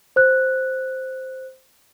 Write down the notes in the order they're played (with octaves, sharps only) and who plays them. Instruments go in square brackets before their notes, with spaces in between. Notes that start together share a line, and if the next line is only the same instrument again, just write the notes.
[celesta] C5 F#6